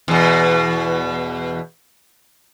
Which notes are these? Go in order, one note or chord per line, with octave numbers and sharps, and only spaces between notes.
E2 B2